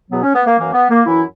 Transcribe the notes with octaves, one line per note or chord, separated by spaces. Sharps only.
E2 B2 F#3 B3
C#4
B3
A#3
F#2 E3 A#3
B3
A#3
F#2 E3 E4